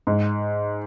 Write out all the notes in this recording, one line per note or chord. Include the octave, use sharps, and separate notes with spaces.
G#2